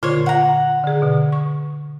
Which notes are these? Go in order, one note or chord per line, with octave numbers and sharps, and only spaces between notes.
A#2 D3 F4 C5 C#5
F#5 A#5
D3 G#4
B2 D3
C#6